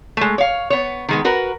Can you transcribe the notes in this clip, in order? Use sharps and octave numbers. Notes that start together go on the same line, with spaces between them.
G#3 A3
C#5 F5
B3 C#5
D#3 G#3 B3
F#4 A#4 B4